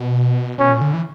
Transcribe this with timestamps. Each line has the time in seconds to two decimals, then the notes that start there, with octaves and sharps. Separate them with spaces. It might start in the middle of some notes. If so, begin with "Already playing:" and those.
Already playing: B2
0.58 B2 C#4
0.70 A#2
0.81 D3
0.94 E3